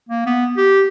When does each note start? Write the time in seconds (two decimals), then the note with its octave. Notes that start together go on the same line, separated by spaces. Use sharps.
0.09 A#3
0.26 B3
0.57 G4